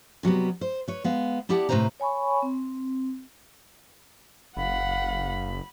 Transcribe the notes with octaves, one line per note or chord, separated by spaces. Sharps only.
C3 F#3 G3 B3
C5
B4 C#5
G#3 B3 F5
B3 E4 G4 D5 F#5 A5
A2 C3 F3 B4 C5 A#5
C#5 G#5 B5 C#6
C4
F#1 F5 F#5 B5